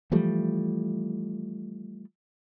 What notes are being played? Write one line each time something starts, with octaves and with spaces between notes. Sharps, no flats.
E3 F3 G3 A3